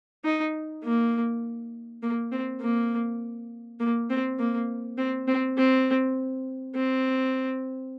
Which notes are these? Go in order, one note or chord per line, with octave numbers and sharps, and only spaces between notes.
D#4
A#3
A#3
C4
A#3
A#3
C4
A#3
C4
C4
C4
C4